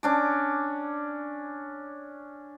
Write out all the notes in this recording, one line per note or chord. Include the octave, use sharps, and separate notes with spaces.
C#4 D4 D6